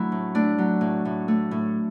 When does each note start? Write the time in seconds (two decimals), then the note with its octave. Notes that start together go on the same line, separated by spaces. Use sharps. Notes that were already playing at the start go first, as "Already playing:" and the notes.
Already playing: F#3 A3 D4 E4
0.12 A2
0.35 A3 D4
0.58 F#3
0.81 A2
1.05 A2
1.28 A3
1.51 A2